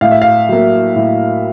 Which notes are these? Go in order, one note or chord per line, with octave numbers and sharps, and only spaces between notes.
A2 F5
E5
F5
F#3 A#3
A2